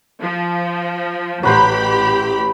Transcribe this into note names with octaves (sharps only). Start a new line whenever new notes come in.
F3
A1 F#3 G4 B4 C5 B5